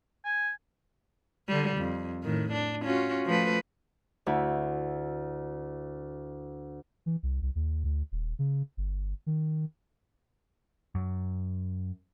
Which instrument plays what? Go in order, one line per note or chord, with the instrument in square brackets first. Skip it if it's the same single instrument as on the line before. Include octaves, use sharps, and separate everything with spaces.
[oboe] G#5
[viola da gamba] D3 G3
F2
A2 D#3
D4
C#4 F4 F#4
F3 A3 B4
[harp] D2 E4
[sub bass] E3
C2
C2
D#2
D2
D#1
C#3
G1
D#3
[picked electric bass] F#2